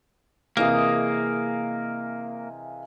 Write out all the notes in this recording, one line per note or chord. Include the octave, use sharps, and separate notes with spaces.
C3 E3 A#3 G#4 A#4 D#5 F5